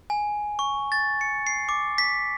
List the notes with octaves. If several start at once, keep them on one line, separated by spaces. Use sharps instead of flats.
G#5
C#6
A6
C#7
C7
D6
B6